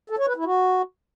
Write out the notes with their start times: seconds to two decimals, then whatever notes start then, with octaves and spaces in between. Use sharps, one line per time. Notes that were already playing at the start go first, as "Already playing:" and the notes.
0.10 A4
0.19 C#5
0.27 B4
0.36 E4
0.45 F#4